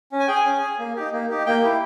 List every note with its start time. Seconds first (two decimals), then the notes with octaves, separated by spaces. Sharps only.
0.12 C#4
0.20 G#5
0.27 G#4 G5
0.34 G#5
0.45 C#4
0.62 G#4
0.79 A#3
0.96 D#4 G4
1.13 A#3
1.30 D#4 G4
1.46 A#3 G5
1.63 E4 G4